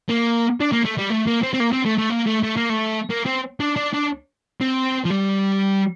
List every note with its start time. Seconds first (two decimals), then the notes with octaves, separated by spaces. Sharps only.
0.10 A#3
0.60 D4
0.72 A#3
0.85 A3
0.97 G3
1.10 A3
1.27 A#3
1.43 C4
1.53 C4
1.60 A#3
1.72 C4
1.85 A3
1.98 A3
2.10 A#3
2.26 A3
2.43 A3
2.57 A#3
2.70 A3
3.10 A#3
3.26 C4
3.60 D4
3.76 D4
3.94 D4
4.60 C4
5.05 F3
5.10 G3